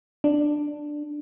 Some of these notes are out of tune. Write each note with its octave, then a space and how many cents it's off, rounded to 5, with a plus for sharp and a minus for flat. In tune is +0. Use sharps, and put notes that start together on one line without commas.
D4 +5